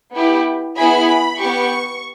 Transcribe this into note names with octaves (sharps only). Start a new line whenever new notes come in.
B3 E4 G4
B3 E4 G#4 B5
B3 G4 C#6